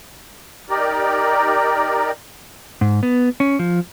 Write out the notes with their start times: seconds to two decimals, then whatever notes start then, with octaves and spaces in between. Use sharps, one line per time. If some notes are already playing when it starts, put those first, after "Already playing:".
0.70 D#4 G4 A#4 D5
2.81 G#2
3.03 B3
3.40 C#4
3.59 F3